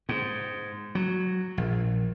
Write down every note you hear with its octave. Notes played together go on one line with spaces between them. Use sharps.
G#2
F#3
A#1